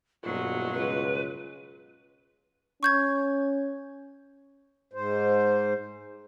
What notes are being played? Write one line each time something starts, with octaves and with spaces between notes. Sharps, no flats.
D#1 G2 B2 F#3 F4
C#2 B4
C#4 C#6 G6 G#6
G#2 C5